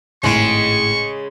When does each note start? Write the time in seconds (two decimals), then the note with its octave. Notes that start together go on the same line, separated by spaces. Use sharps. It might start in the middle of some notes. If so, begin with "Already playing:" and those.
0.23 G#1 A2 C#3 G#3 C#6